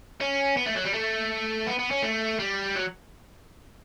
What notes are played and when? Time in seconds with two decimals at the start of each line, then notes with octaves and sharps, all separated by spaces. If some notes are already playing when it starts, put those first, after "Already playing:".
0.21 C#4
0.57 B3
0.66 A3
0.75 F#3
0.84 G3
0.94 A3
1.67 B3
1.79 B3
1.91 C#4
2.02 A3
2.40 G3
2.76 F#3